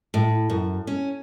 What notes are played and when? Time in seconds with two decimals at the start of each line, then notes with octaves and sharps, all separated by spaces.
0.14 A2
0.50 F#2
0.87 C#4